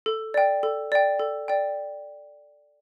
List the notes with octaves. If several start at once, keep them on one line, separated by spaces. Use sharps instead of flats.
A4
D5 G5
A4
D5 G5
A4
D5 G5